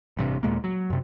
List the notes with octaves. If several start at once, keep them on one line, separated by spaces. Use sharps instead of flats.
A1 G2 C3
D#2 A#2 G#3 A#3
F#3
F#2 C3